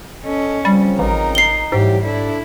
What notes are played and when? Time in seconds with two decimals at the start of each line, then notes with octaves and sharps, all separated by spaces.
0.25 C#4 A4 D#5
0.65 C#3 F3 G3 C4
0.99 A1 D#4 A#4
1.35 C7 G7
1.72 G#2 E3 F#3 G3 G4
2.04 D4 E4 A4 D5